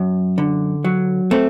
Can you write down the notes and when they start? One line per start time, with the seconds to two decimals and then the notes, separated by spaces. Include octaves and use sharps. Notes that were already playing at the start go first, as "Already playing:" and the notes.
Already playing: F#2
0.38 D3
0.84 F#3
1.31 A3 C4